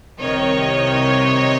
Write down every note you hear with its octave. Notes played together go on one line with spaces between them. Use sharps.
C2 C3 D#3 C#5 D#5